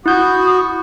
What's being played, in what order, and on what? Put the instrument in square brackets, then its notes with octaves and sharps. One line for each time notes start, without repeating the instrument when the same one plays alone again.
[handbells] E4 G6 [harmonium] F#4 [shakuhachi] D#6